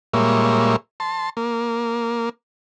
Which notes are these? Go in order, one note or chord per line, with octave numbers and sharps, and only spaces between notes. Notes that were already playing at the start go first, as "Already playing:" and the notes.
A#2 G3 G#3 A#3 C#5 E5
A5 C6
A#3